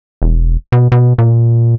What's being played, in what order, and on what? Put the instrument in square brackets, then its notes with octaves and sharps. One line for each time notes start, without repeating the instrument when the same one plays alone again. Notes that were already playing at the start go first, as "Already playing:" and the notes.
[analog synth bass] E1
B2
B2
A#2